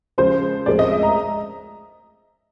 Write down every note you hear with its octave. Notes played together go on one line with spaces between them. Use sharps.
C#3 F3 G#3 C5
A2 F3 G#3 C4 D5
D#5
E5
A#5